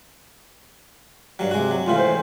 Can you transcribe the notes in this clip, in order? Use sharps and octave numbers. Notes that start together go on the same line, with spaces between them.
G2 F#3
C3 G#3 F#4
F#3
C#2 A2 E3 F4
C5